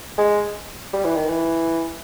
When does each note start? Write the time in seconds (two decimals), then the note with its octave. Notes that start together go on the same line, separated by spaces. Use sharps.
0.18 G#3
0.93 G3
1.05 E3
1.16 D#3
1.29 E3